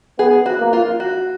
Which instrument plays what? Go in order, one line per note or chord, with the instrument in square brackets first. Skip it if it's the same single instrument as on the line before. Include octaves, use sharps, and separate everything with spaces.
[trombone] B3 [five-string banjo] G#4
[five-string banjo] F#4
[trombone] A#3
[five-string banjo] F4
F#4